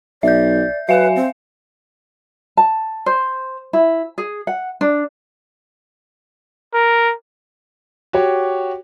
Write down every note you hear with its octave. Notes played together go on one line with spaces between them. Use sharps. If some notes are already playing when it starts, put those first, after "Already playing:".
B1 D5 E5 G6
F#3 B4 E5 F5 G#5
C4
A5
C5
E4
G#4
F#5
D4
A#4
F#4 G4 C#5